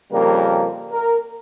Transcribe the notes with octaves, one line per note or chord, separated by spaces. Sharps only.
F2 C#3 G3 A#3 A#4
A#4